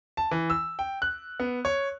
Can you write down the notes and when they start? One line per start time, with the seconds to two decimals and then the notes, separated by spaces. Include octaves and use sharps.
0.17 A5
0.31 E3
0.50 E6
0.79 G5
1.02 F#6
1.40 B3
1.65 C#5